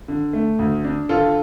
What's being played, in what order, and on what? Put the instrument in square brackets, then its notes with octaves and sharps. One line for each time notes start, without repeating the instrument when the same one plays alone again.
[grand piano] D3
A3
D2
D4
[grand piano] D3 [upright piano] F4 A4